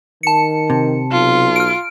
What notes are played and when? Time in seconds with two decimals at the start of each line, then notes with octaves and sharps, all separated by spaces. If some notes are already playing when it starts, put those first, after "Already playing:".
0.23 D#3 A5 C#7
0.70 C3
1.11 B1 F4
1.56 F6 D7